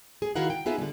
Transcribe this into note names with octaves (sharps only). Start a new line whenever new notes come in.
G#4
D#3 E4 F#4 A#4 F5 F#5
G5
B3 D#4 F4 G#4 E5
D3 G3